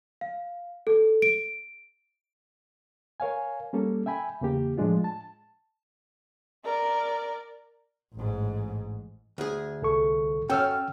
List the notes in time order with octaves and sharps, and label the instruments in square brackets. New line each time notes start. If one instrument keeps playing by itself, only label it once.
[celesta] F5
A4
D7
[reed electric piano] A#4 C#5 F5 G#5
G3 A#3 C#4 A4
E5 G5 G#5 B5
E2 C#3 A#3 G4
A2 F3 G#3 D4 F4
A5
[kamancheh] A#4 D5
[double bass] A1 G#2
[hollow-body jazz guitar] D2 G#4
[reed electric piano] C2 A4 C#6
[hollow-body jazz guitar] F#2 C#4 A4 [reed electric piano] G5 E6 F6